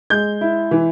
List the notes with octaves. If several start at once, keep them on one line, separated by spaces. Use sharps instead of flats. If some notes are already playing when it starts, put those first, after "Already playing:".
G#3 G6
E4
E3